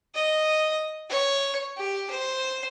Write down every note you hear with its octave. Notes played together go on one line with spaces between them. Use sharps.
D#5
C#5
G4
C5